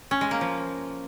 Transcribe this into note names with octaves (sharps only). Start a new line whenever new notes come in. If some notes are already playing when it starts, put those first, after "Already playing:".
C#4
G#3
A#3
F3